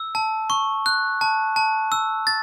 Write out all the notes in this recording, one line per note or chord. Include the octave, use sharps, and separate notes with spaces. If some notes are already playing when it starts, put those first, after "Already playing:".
Already playing: E6
A5
C#6
F#6
A5
A5
E6
A6